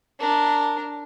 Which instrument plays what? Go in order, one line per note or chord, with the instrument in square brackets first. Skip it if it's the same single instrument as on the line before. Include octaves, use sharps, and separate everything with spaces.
[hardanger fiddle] D4 A#4